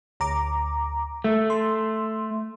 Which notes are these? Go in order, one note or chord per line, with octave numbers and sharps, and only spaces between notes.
D2 A#5 D6
A3
C6